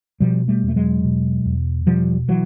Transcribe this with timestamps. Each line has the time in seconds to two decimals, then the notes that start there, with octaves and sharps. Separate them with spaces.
0.20 B2 F3 G3
0.48 G3 A3
0.63 E2
0.68 A3
0.76 F#3 G#3
1.04 B2
1.45 E2
1.86 B2 F3 G3
2.29 E3 F#3